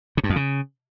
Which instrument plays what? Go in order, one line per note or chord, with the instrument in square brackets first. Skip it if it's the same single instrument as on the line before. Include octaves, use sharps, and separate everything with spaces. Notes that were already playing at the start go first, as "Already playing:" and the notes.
[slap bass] C3
G2
F2
C#3